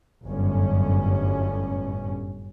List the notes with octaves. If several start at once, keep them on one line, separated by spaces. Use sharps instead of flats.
G1 F#2 A2 C#4